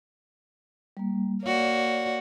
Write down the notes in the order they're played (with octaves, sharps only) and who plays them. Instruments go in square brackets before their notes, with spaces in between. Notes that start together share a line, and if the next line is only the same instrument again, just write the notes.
[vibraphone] G3 A#3
[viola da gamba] A#3 F#4 [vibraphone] C#5 D5